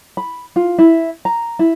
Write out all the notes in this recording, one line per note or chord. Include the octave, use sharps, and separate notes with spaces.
B5
F4
E4
A#5
E4